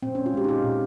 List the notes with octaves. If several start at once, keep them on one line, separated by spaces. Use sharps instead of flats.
A#2 C4
G#3 C#4
F4
G#3 G4
D#4
A#2 F4
A#2